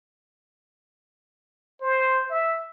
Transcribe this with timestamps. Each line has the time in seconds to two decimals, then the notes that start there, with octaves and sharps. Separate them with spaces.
1.82 C5
2.30 E5